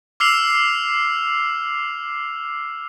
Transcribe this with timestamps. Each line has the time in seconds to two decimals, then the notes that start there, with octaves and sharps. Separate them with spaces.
0.20 D6 E6 F6 C7 F7